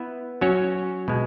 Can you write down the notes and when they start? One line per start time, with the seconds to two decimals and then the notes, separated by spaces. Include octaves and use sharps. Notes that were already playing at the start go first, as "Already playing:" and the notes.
Already playing: B3 E4 B4 E5
0.41 F#3 C#4 F#4 C#5
1.08 B2 G#3